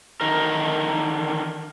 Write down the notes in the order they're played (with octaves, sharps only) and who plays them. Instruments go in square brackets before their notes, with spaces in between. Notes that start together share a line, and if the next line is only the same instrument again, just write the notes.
[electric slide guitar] D3 D#3 A#4